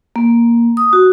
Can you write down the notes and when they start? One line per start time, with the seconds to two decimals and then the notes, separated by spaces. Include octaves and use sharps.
0.16 A#3
0.77 D#6
0.93 F#4